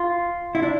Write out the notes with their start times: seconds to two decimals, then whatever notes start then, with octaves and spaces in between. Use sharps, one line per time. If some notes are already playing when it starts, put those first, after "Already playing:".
Already playing: F4
0.55 E4
0.63 D4